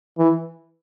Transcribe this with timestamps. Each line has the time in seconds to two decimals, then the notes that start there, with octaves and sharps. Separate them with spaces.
0.18 E3